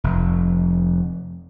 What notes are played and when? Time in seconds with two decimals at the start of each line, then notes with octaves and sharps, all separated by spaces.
0.04 F1